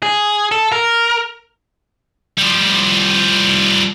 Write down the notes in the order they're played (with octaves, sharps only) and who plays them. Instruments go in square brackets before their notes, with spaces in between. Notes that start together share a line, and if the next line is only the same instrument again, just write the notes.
[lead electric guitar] G#4
A4
A#4
[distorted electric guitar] F3 G3